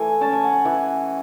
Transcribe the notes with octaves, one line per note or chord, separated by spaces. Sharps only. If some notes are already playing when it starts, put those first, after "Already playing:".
Already playing: E3 A3 G#5
C#4 A5
G#5
F#5
G#5
E3